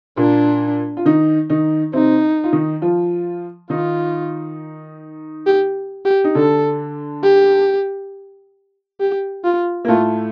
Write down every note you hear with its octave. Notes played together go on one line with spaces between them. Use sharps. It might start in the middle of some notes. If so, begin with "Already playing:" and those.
A#2 A#3 D4
F4
D#3 D#4
D#3 D#4
C3 C4 D#4
F4
D#3 D#4
F3 F4
D#3 D#4 F4
G4
G4
D#4
D3 D4 A4
G4
G4
F4
A#3
A2 A3 F4